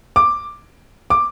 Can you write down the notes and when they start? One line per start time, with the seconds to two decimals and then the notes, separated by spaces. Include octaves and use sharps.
0.16 D6
1.10 D6